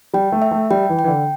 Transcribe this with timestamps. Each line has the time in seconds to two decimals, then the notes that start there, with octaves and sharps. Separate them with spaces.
0.14 G3 G5
0.32 A3
0.42 E5
0.51 A3
0.70 G3 G5
0.89 E3
0.99 G5
1.04 E3
1.08 D3